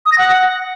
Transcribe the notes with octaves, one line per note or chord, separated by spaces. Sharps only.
D#6
A#6
F#5